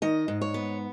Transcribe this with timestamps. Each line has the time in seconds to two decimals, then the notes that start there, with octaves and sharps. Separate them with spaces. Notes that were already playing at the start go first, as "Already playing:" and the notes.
0.02 D#3 D#5
0.28 G#2
0.41 C#5
0.54 B3